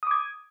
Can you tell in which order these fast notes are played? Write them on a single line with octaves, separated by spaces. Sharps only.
D#6 D6 G#6